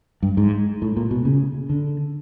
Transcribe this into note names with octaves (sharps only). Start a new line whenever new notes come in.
G2
G#2
A2
A#2
B2
C#3
D3